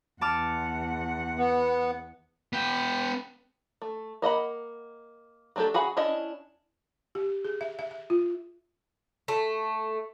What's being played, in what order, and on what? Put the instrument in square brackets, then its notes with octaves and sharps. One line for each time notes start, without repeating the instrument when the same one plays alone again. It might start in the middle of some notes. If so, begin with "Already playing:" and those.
[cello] E2 F#5 [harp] A5 D6 F6
[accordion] B3
[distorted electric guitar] B3 G5
[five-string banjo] A3
A#3 D#5 F#5 B5
F#3 A3 D4 G4 A4
F#4 G#4 F#5 B5
C#4 D4 E4 D#5
[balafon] G4
G#4
E5
E5
E5
F4
[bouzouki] A3